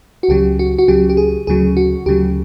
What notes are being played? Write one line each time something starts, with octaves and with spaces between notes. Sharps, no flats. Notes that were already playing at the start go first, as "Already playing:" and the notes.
F#4
C#2 C#3 F#3 G4
F#4
F#4
C#2 C#3 F#3 G4
G4
G#4
D2 C#3 F#3 G#4
F#4
D2 C#3 F#3 G4